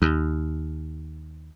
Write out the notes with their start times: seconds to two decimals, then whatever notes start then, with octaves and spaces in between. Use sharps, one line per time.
0.02 D#2